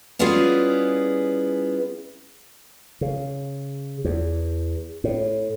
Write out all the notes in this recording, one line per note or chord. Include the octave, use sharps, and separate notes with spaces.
G3 B3 C#4 E4 F4 G#4
C#3
E2
A2